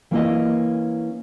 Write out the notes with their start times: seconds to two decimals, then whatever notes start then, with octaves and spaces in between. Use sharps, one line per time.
0.11 E3 A#3 C#4 E4 D5 D#5